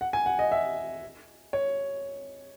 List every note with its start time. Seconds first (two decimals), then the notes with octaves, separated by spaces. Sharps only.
0.01 F#5
0.13 G#5
0.26 F#5
0.39 D#5
0.52 E5
1.53 C#5